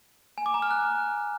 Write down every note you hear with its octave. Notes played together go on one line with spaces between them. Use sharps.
G#5
D6
A#5
F6
F#6